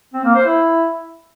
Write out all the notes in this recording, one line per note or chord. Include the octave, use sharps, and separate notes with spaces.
C4
A#3
C5
E4